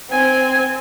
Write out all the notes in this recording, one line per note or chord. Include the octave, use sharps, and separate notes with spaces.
C4 G#5